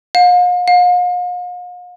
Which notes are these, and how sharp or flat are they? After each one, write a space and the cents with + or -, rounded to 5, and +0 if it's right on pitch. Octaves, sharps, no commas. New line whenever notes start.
F5 +45
F5 +45